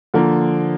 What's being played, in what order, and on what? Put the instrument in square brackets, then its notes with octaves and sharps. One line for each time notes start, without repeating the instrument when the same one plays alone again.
[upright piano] D3 F3 A#3